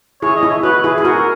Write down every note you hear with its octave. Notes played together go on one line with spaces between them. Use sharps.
E4 G#4 C#5
D#5
E4 G#4
C#5
F#4 B4
E4 G#4
G#4
F#4 A#4